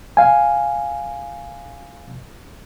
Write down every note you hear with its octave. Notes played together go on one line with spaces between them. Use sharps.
F5 G#5